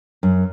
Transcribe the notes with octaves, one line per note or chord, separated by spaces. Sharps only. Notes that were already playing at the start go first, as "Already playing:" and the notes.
F#2